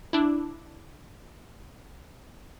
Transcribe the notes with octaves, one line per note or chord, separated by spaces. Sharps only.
D4 E4